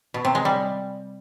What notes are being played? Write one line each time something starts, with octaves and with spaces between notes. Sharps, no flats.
B2
C3
G#3
G3